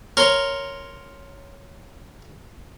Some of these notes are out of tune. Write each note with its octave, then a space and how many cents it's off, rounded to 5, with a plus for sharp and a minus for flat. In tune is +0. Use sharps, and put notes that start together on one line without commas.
A#4 +0 C#5 +0 C6 +0